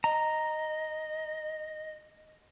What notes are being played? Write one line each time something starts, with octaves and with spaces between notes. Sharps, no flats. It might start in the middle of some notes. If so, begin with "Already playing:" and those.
D#5 A#5